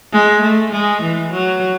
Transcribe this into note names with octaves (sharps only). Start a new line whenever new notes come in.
G#3
A3
G#3
E3
F#3